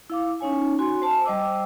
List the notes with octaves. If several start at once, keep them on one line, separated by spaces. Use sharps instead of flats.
E4 F5 D6
C#4 D#4 C#5 G#5
F#4 G#5 C6
C5 A5
G3 C5 D#5 D6 E6